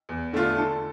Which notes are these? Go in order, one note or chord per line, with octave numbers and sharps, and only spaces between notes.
E2
D3 A3 D4 F4
D3 A4